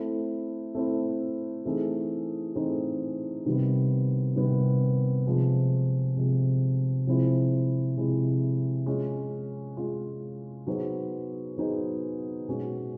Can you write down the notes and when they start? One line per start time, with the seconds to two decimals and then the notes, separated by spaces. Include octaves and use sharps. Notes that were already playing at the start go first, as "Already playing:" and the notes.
Already playing: A3 C4 E4
0.75 A3 C4 E4
1.65 E3 A3 C4 D#4 G#4
2.55 E3 A3 C4 D#4 G#4
3.46 C3 D#3 G3 B3
4.36 C3 D#3 G3 B3
5.26 C3 F3 G#3
6.16 C3 F3 G#3
7.07 C3 F3 G#3 C4 E4
7.97 C3 F3 G#3 C4 E4
8.86 G#3 C#4 F4
9.77 G#3 C#4 F4
10.67 F#3 B3 D#4 G#4 C5
11.57 F#3 B3 D#4 G#4 C5
12.48 B2 G#3 C#4 F#4